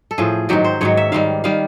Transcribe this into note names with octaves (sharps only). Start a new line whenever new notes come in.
A4
A2 F3 G#4
G#2 D#3 F#3 G4
C5
G#2 D#3 F#3 C#5
E5
G#2 D#3 G3 F5
D#3 G3 F5